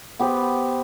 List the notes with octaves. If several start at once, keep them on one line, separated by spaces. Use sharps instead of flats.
B3 G4 B4 C5